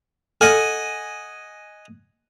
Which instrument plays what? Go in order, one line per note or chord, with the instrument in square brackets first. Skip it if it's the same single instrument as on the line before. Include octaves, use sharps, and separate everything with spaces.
[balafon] A4 [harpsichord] D#5 F#5 G#5